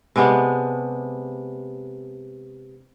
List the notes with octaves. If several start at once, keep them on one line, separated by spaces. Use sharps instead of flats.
C3 G#3 B3 D4